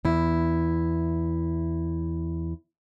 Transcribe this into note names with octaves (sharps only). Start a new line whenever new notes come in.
E2 E4